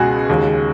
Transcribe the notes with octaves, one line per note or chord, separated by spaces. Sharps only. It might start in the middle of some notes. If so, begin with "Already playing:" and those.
Already playing: C#2 B2 G#3 F#4 G#4
D#2 C#3 G#3